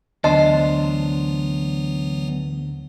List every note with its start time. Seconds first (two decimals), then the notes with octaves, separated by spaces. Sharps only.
0.24 D2 E3 F#3 B3 D4 C5 D#5 A5